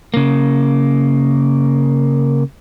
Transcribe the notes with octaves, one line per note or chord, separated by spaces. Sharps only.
C#3 A#3